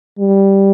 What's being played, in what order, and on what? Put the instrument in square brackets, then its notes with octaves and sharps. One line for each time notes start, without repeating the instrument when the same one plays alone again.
[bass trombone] G3